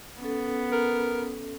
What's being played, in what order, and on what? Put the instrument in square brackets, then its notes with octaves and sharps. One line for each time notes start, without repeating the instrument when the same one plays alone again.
[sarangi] B3 [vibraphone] C#4 A4
[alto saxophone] A#4